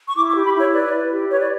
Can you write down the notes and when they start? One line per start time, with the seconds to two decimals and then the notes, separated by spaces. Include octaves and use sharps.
0.08 C#6
0.16 E4 D6
0.31 C#6
0.36 G4
0.44 B5
0.54 E4 C#5
0.74 B4 D5
0.93 E4
1.11 G4
1.30 B4 C#5
1.39 D5